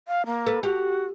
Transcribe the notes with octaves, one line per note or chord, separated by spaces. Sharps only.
F5
A#3
A4 B4
F#4 G4